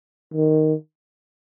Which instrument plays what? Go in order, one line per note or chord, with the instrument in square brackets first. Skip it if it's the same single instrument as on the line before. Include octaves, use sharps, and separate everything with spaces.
[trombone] D#3